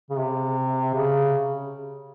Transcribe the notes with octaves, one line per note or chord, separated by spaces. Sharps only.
C#3
C3
C#3